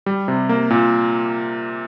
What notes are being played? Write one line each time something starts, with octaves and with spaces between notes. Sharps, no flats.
G3
C3
A#3
A#2